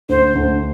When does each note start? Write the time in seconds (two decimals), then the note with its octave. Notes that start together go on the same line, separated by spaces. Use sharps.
0.09 D2 C5
0.35 D2